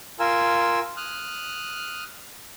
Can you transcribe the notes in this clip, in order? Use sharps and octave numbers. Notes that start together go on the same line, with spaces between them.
F4 A#4 G#5 E6
D#6 F6 F#6